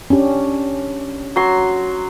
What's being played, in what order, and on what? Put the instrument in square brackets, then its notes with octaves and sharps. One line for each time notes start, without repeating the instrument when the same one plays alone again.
[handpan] C#4 D4 G4
[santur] F#3 C6